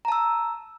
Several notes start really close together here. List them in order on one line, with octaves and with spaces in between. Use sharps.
A#5 A5 E6